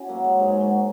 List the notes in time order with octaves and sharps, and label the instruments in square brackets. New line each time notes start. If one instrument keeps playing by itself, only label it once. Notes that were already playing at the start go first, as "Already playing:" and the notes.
Already playing: [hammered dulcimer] C#4 E4 F#4
F#3 A#3
G#3
G#2 G#3
F#3